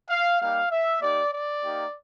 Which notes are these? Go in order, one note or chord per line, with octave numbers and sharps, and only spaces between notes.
F5
G3 A#3 D#4 G4 F5
E5
A#3 D#4 G4 D5
D5
A#3 D#4 G4